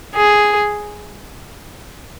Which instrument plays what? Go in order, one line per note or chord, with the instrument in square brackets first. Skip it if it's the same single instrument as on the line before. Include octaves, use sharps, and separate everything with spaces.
[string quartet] G#4